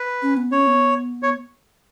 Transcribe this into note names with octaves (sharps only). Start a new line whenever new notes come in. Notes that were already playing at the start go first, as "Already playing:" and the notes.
Already playing: B4
C#4
B3
C#4 C#5
B3
C#5